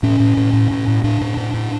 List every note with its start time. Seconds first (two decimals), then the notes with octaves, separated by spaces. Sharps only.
0.03 A2 C#4
0.20 A2
0.37 A2
0.53 A2
0.71 A2
0.88 A2
1.04 A2 D4
1.21 A2
1.37 A2
1.54 A2